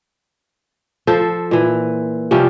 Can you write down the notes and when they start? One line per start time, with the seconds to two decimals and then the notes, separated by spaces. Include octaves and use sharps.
1.07 F3 A4 C5
1.51 A#2 E3
2.31 C3 F3 G3 C#4